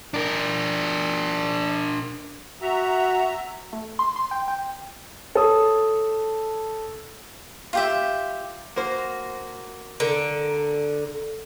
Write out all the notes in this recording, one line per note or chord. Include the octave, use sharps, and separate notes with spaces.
D4 A#4
F#4 E5 A#5
A3
C6
C6
G5
G5
A4 C#5 D#6
F4 G4 E5
A#3 F#4 C5
D3 A#4